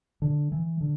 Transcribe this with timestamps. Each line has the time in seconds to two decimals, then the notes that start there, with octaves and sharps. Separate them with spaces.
0.22 D3
0.52 E3
0.81 D3